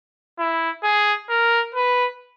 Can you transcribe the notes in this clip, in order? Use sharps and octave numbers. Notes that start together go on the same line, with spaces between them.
E4
G#4
A#4
B4